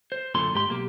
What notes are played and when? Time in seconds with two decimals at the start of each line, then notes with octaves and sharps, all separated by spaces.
0.12 C5
0.35 F#2 A#2 D3 C6
0.55 G#2 G4 C6
0.69 B1 A#3 G4